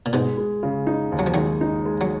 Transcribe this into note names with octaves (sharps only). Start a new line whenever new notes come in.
A#2
G#2 B2 G#3
G#3
C#3
D#4
D#2
F#3
F3
D#3 F#3 G#3
D#4
G#3
F#3